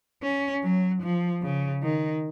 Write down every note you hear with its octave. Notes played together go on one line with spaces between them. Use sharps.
C#4
F#3
F3
C#3
D#3